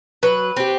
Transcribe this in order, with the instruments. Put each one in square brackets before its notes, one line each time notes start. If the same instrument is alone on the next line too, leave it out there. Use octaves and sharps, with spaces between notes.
[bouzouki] F#3 [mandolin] B4
[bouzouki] C4 G4